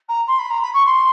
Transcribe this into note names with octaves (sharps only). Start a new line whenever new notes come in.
A#5
C6
B5
A#5
B5
C#6
C6